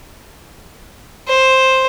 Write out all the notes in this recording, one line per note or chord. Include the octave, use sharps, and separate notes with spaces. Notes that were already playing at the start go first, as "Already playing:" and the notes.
C5